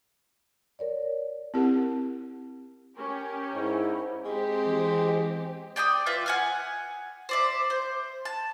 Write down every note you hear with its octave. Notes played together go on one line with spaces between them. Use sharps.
A#4 C#5 D5
C4 E4 G4 A#4 F#5
C#4 G4 A#4
G#2 E4
G#3 C4 G4
E3
D5 G5 B5 D#6
F4 B4 E5
F#5 G#5 F6
C5 D5 E5
C5
A5